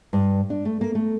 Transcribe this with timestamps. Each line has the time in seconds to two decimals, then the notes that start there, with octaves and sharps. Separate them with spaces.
0.13 G2
0.50 D4
0.65 A3
0.81 A#3
0.95 A3